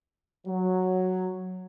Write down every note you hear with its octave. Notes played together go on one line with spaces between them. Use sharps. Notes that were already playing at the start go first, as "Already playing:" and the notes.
F#3